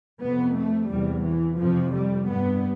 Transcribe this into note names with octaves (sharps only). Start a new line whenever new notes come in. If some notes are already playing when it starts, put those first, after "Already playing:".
F2 C3 B3
A3
E2 C3 G3
E3
F2 C3 F3
G3
G2 B3